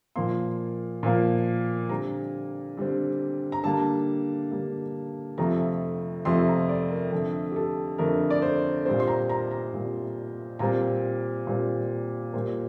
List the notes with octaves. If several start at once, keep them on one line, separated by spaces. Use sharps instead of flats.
A#2 F3 A#3 C6
A#2 F3 A#3
D3 G3 C4 A#5
D3 G3 C4
A#5
D3 G3 A#3 A5
D3 G3 A#3
F2 C3 F3 A3 A#5
F2 C3 F3 A3 C6
A#5
D5
A#4
F2 D3 A3 A4
G4
A4
F2 D3 A3 A#4
D5
C5
A#2 G3 C4 C5
C6
A#5
A#5
A#5
A#2 G3 C4
A#2 G3 C4 A#5
A#2 G3 C4
A#2 G3 A#3 C5